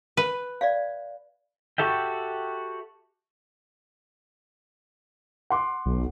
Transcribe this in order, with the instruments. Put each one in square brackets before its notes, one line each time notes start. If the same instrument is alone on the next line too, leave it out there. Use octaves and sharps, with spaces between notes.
[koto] B4
[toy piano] D5 E5 F5
[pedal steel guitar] F#4 G4 A4 E5 G5
[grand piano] F#5 C6 D6
[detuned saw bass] B1